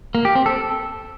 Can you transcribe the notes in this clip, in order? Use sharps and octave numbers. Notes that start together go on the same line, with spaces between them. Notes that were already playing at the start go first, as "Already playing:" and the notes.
A#3
G4
C4
A4